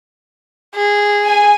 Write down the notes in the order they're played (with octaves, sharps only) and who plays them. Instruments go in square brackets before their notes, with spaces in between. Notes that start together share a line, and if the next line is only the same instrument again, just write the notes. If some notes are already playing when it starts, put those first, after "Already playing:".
[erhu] G#4
[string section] G#5